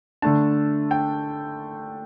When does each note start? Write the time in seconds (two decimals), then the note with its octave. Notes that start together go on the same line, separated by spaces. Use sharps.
0.22 D3 A3 D4 A5
0.91 G5